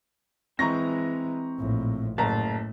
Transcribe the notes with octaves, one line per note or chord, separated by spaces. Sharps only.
E3 G#3 C4 D#5 A#5 C#6 A#6
A#1 A2
F#1 A2 A5 A#5